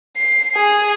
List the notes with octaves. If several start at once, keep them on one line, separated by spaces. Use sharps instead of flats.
C7
G#4